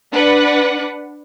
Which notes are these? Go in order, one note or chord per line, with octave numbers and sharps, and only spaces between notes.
D4 B4 F#5